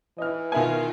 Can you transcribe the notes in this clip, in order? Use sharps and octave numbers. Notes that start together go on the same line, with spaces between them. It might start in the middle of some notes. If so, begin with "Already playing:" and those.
E3 D#5 F6
B2 D#3 E4 F4 G#5